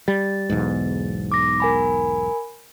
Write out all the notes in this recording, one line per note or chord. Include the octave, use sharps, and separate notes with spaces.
G3 A6
B1 E2 G#2
D6 A#6
A#4 G#5 B5